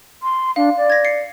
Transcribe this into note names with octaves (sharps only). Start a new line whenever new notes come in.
C6
D4 F5
D5
G#6 A#6
C7 C#7